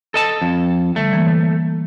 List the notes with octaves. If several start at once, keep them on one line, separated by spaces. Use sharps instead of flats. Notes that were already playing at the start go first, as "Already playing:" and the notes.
A4 D#5 A5
F2
D3 G3 A3
E3 A#3